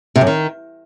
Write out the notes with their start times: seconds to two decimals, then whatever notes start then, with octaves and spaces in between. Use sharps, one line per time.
0.16 C3
0.21 F#2
0.27 D#3